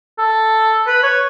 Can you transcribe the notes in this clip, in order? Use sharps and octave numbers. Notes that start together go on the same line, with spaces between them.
A4
B4
C#5